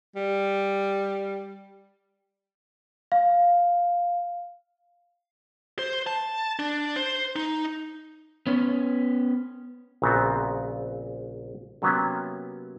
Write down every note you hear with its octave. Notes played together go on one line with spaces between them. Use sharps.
G3
F5
C5
A5
D4
C5
D#4
B3 C#4
A#1 A#2 C#3 B3 C4 F#4
C3 F#3 A#3 B3 C#4